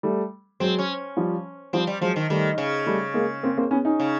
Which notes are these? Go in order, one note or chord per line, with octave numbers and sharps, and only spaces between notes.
G3 A3
F#3 G#3 C4
C#4
F3 G3
F3 G3 C4
G3
F3 F#3 G#3
D#3
D#3 G3 A3
C#3
G3 A3
G#3 A#3
A#3 C4
A#3 C4
B3 C#4
C#4 D#4
C#3